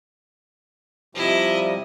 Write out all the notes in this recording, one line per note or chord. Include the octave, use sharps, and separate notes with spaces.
C3 F3 G3 E4 D#5